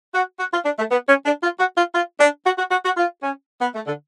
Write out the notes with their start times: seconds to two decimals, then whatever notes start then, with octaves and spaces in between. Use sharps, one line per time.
0.15 F#4
0.40 F#4
0.53 F4
0.65 D4
0.79 A3
0.91 B3
1.09 C#4
1.26 D4
1.43 F4
1.60 F#4
1.77 F4
1.94 F4
2.20 D4
2.46 F#4
2.58 F#4
2.71 F#4
2.85 F#4
2.97 F4
3.23 C#4
3.61 B3
3.75 A3
3.87 D3